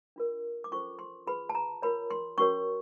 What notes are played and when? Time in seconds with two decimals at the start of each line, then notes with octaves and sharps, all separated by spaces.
0.16 D4 F4 A#4
0.64 D6
0.71 C#4 F4 A4 C5 C#6
0.99 C6
1.27 F4 G#4 B4 B5
1.49 A5
1.55 A#5
1.82 F4 A#4 C#5 B5
2.11 C6
2.38 C#4 F#4 A#4 C#5 C#6